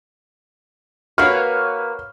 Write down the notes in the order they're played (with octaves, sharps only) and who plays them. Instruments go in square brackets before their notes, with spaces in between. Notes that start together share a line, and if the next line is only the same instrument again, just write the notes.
[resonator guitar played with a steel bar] A#3 F#4 [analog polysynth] B4 C#5 [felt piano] F6